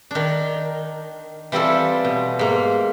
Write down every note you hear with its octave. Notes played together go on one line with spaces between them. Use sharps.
D#3 D4
E3 G3 C4 E4 F4 A4
B2
G#2 A#3